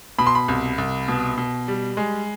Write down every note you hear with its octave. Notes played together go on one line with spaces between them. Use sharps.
B2 B5
C6
B5
C2
C2
B2
B2
G3
G#3